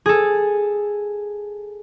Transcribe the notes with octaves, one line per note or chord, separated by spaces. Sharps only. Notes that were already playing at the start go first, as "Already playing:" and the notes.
G#4 A4